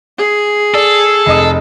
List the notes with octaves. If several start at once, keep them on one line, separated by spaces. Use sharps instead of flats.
G#4
A4 D5
F1 D#5 D#6